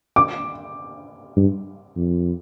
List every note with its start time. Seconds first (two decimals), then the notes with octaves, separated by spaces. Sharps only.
0.16 D6
1.37 G2
1.96 F2